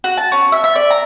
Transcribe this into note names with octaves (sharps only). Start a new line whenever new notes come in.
F#4
A5
C#4
E5
E5
D5
A#5